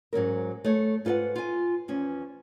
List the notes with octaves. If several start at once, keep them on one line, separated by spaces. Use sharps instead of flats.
G#2 F#3 C#4 A#4
A3 C#5
G#2 F4 A4 B4 F#5
F4 G#5
E2 F3 C#4